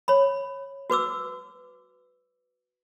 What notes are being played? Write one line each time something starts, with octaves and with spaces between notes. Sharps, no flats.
C#5 B5
F#4 B4 D6 E6